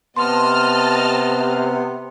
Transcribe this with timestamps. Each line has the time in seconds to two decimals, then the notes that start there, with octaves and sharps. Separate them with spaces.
0.16 C3 B3 D#5 A5 C6 F6